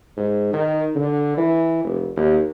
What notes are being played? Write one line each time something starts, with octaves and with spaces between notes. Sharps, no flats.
G#2
D#3
D3
E3
F1
D#2